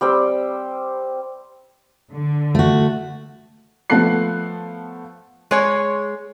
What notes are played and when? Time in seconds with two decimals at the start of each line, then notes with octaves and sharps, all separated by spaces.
0.01 G3 C4 G5
2.11 D3
2.55 A3 F#4
3.90 F3 A3 B3 A4 F#6 C7
5.51 G#3 C#5